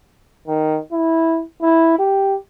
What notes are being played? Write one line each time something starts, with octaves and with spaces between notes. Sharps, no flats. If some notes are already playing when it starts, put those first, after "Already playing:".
D#3
E4
E4
G4